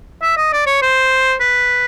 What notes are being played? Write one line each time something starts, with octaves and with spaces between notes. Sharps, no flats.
E5
D#5
D5
C#5
C5
B4